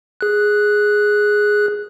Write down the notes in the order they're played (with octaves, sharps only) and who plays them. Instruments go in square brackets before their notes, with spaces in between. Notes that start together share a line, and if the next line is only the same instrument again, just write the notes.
[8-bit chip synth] G#4 F#6